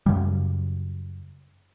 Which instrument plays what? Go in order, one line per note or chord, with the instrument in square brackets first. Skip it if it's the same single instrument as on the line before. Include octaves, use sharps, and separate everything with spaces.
[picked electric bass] F#2 C#3 G3